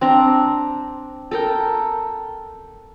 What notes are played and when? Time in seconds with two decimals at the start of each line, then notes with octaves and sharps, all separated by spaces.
0.01 C4 D4 A#5
1.31 A4 A#4 G5